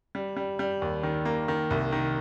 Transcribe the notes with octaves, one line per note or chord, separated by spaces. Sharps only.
G3
G3
G3
D#2
D#3
A#3
D#3
C2
D#3